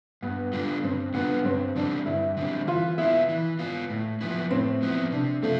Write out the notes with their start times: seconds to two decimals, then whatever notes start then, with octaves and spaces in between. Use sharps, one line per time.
0.22 G2 B3
0.53 D3 G3 D4 F4
0.84 G2 C4
1.14 D3 G3 B3 D4 F4
1.45 G2 C4
1.76 D3 G3 C4 D4
2.06 G2 E4
2.37 D3 G3 C4
2.67 E3 F4
2.98 B3 E4 F4
3.29 E3
3.59 B3 F4
3.90 A2
4.21 F3 B3 E4
4.51 A2 C4
4.82 F3 B3 E4
5.12 C3 D4
5.43 F3 A3 C4 F4